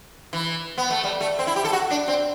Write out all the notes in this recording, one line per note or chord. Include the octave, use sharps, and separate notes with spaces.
E3
B3
A3
G3
A3
C4
E4
G4
A4
F#4
D4
C4